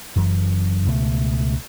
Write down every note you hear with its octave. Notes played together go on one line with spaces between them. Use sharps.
F#1 F#2 E3
C#2 B2 F#3 A3